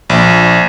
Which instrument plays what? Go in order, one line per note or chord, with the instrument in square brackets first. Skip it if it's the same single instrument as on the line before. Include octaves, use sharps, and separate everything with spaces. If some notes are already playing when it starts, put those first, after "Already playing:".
[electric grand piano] A#1